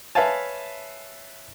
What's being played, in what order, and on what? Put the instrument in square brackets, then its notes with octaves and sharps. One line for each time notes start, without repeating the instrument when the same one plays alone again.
[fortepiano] B4 C#5 E5 F5 G#5 A5